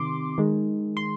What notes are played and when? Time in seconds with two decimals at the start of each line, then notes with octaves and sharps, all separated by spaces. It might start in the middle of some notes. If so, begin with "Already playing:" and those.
Already playing: C3 D#3 C6 D6
0.38 D#3 G#3
0.97 C6